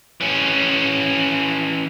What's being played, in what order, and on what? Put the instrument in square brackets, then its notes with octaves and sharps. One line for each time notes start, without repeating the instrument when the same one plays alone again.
[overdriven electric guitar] E3 C#4